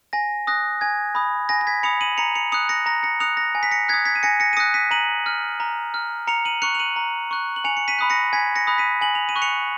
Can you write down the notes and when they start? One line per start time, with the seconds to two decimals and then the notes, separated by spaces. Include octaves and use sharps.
0.13 G#5 A#6
0.47 D#6 F#6 A#6
0.81 G#5 G#6
1.15 B5 D#6
1.49 G#5 A#6
1.61 A#6
1.67 G#6 B6
1.83 B5 D#6 C#7 F7
2.01 D#7 F#7
2.17 A#5 C#7 F7
2.35 C#7 F7
2.52 D#6 F#6 C#7 F7
2.69 A#6 C#7
2.86 A#5 A#6
3.03 A#6 C#7
3.20 D#6 F#6 C#7 F7
3.37 A#6
3.55 G#5
3.63 B6
3.71 A#6 C#7
3.88 D#6 F#6 G#6 B6
4.05 G#6 B6
4.15 D#7
4.23 G#5 A#6 C#7
4.40 A#6 C#7
4.53 D#7
4.57 D#6 F#6 A#6 C#7
4.74 B6 D#7
4.91 A#5 D#7 F#7
5.26 F6
5.60 A#5
5.94 F6
6.27 A#5 C#7 F7
6.45 D#7 F#7
6.62 C#6 F#6 C#7 F7
6.75 F7
6.80 D#7 F#7
6.96 A#5
7.31 C#6 F#6
7.56 F#7
7.64 G#5 C#7 F7
7.77 C#7
7.88 B6 D#7
7.99 B5 D#6 F#6
8.10 A#6 C#7
8.33 G#5 G#6 B6
8.56 A#6 C#7
8.67 B5 D#6 F#6
8.78 B6 D#7
9.01 G#5 F#7
9.15 F7
9.29 D#7
9.36 C#6 F#6
9.42 C#7 F7